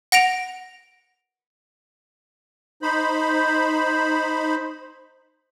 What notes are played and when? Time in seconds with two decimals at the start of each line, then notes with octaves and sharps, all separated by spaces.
0.12 F#5 A#6 D7 F7
2.82 D#4 C5 B5